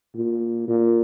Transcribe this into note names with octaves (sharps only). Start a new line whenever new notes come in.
A#2
A#2